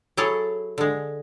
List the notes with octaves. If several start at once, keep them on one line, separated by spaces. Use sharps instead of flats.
F#3 E4 G#4 A4 C#5
D3 G#3